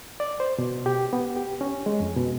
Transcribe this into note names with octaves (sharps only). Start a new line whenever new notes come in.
D5
C5
B2
G4
B3
G4
C#4
G#3
F2
B2